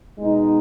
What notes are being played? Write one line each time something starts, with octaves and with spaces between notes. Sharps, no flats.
B2 G#3 B3 D#4